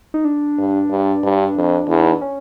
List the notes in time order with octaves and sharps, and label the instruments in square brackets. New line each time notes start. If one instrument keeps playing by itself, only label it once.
[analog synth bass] D#4
D4
[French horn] G2
G2
G2
F2
E2
[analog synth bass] D#4
D4
C#4